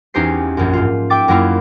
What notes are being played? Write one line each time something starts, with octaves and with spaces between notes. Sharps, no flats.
E2 C#4 D#4 G4 C5 C7
A#1 F#2
G#2 F4
E5 G5 D6 A6
F#2 F#3 A#3 E4 F4